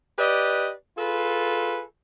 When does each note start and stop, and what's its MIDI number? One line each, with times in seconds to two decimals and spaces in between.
0.19 0.73 67
0.19 0.73 71
0.19 0.73 74
0.19 0.73 75
0.98 1.83 65
0.98 1.83 68
0.98 1.83 69
0.98 1.83 71